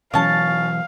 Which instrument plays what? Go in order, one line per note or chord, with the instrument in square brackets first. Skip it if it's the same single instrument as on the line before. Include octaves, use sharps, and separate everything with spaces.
[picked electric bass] B2 E3 F#3 [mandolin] C#4 A5 [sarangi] F5